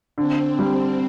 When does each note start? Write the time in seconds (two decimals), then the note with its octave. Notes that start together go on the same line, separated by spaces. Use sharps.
0.18 D3 C4
0.59 G3